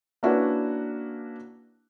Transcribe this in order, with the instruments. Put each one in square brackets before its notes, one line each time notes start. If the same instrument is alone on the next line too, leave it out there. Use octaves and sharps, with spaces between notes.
[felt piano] A#3 C#4 D4 E4 F#4 B4